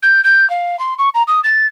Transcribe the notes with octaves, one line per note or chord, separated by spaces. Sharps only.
G6
G6
F5
C6
C#6
A#5
D#6
A6